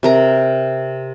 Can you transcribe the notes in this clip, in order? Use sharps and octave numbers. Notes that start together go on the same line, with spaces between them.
C3 A#4 A#5